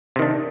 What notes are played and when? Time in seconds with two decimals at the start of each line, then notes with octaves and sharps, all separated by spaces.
0.16 C3
0.19 D#3
0.22 D4